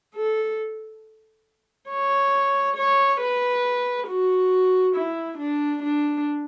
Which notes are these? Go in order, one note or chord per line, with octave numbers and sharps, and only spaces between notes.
A4
C#5
C#5
B4
F#4
E4
D4
D4